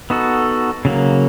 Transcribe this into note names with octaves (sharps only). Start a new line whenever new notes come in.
B3 D#4 F#4 A4
C#3 F#3 A#3